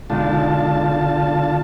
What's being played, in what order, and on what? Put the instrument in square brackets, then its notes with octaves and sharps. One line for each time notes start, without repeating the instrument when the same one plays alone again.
[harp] B1 G#3 [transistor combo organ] D3 F4 A5